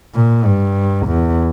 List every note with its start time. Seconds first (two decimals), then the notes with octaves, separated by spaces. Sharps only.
0.15 A#2
0.45 G2
1.07 E2